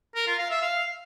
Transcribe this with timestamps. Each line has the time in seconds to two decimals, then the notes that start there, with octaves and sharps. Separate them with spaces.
0.16 A#4
0.27 F4
0.39 F5
0.50 E5
0.62 F5